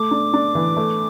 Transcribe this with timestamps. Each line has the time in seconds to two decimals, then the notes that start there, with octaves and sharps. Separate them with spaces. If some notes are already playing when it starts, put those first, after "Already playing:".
Already playing: A3 D6
0.11 D4
0.34 D4
0.55 E3
0.77 A3